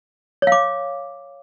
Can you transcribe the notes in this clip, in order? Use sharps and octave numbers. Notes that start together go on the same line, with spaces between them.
C#5 F5 D6